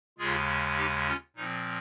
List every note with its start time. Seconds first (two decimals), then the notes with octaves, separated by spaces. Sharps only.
0.18 D#2 C#3 G#3 F4 G#4
0.77 D#4 G4
1.07 C#4 F4
1.36 A#2 F3 C4 D#4